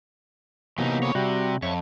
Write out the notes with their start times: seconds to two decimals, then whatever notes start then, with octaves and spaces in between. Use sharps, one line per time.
0.78 C3 E3 F#3 A#3 B3 D#4
1.03 E3 G#3 C#5
1.15 C3 G3 F#4
1.62 F2 C#5 E5 C#6